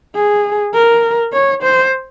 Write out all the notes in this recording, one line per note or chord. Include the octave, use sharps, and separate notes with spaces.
G#4
A#4
C#5
C5